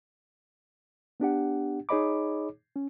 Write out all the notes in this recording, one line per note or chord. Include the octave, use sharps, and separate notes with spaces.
B3 D4 G4 F#5
D#4 G#4 C#5 D#5 B5 D6
C#4